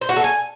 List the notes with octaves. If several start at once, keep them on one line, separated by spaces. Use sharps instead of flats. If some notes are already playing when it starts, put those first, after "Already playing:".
C5
F#4
A4
G#5